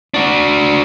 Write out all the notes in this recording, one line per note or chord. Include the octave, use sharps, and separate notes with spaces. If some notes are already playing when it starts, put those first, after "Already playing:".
D4 F#4